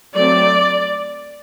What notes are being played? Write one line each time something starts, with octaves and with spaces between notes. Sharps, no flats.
F#3 A3 C4 D5